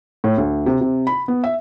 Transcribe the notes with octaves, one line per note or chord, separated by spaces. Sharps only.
A2
D2
C3
C3
B5
B3
E5